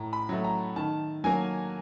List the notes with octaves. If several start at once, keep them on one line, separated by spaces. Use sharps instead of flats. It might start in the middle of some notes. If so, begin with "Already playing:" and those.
Already playing: A2 A#5
B5
F#3 A3
A#5
D#3 A5
F#3 A#3 G#5